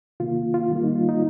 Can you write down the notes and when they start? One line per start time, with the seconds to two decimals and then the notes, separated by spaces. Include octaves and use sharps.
0.20 C3 D#3 A#3 F4
0.54 F4
0.70 D#3 G3 A#3
0.84 D#4
0.96 F4
1.09 D#4